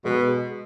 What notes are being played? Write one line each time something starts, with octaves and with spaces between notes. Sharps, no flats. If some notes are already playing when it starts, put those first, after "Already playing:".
B2 G#3